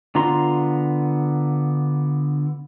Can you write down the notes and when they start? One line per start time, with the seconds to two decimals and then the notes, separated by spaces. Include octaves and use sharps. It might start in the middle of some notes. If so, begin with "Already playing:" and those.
0.15 D3 B3 F4 A#5 C6